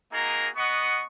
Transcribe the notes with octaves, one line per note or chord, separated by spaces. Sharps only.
A#3 D#4 F#4 G#4 A#4
B3 D#5 F#5 C#6